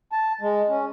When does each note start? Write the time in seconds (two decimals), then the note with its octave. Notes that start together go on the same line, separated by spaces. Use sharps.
0.12 A5
0.41 G#3
0.69 C#4